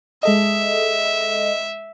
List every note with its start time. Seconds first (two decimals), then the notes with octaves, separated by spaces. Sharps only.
0.23 G#3 A4 D#5 E5